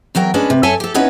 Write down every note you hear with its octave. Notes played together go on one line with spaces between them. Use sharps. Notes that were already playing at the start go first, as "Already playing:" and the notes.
E2 F#3 A#4 G5
G#3 C#4 D4 B4
C3
F#2 A4 C#5 E5 G#5 A5
G4 A4
B3 C#4 D#4 E4 B4 C#5